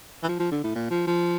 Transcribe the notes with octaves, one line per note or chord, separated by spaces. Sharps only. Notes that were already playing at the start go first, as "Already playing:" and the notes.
E3
F3
F3
D3
A2
A#2
F3
F3